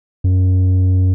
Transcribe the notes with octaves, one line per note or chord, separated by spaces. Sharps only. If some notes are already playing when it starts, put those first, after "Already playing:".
F#2